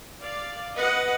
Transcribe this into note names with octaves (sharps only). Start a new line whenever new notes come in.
D5 F5
B4 D#5 F#5